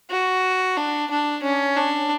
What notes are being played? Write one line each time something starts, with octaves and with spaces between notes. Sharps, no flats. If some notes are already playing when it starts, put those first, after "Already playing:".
F#4
D4
D4
C#4
D4